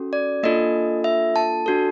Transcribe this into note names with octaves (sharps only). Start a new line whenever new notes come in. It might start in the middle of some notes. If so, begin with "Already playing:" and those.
Already playing: C#4 F#4 A4
D5
A#3 D4 F4 A4 D#5
E5
A5
D4 F#4 A4